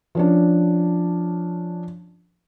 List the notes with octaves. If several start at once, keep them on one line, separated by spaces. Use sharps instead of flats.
F3 C#4 D4